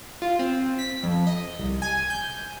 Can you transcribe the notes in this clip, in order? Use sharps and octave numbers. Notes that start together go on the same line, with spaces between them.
F4
C4
B6
F2
D#5
C2
G#5
G6